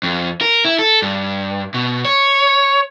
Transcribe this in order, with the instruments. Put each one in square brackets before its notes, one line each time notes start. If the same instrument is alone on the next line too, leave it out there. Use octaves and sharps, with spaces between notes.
[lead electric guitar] F2
A#4
E4
A4
G2
B2
C#5